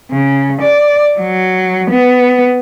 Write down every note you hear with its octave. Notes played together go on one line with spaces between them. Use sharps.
C#3
D5
F#3
B3